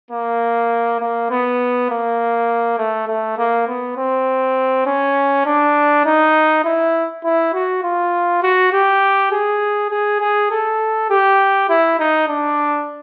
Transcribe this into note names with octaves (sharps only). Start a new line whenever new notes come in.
A#3
A#3
B3
A#3
A3
A3
A#3
B3
C4
C#4
D4
D#4
E4
E4
F#4
F4
F#4
G4
G#4
G#4
G#4
A4
G4
E4
D#4
D4